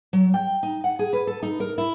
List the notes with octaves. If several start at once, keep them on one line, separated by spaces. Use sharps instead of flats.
F#3
G5
D#4
F#5
G#4
B4
A4
D#4
A#4
E4